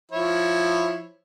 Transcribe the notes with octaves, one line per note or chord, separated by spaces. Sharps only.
F3 E4 C#5